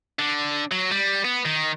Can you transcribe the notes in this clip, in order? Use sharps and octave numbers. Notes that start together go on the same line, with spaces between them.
D3
F#3
G3
B3
D#3